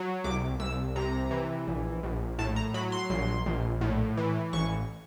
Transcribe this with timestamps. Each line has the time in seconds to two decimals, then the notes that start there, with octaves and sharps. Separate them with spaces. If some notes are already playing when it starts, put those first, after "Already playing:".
Already playing: F#3
0.24 C2 D6
0.60 C2 E6
0.96 C3 A#5
1.31 E3
1.67 A#1
2.03 A#1
2.38 A2 A5
2.56 A#5
2.74 F#3 B5
2.92 C6
3.10 A#1
3.46 A#1
3.81 A2
4.17 E3
4.53 A1 C#6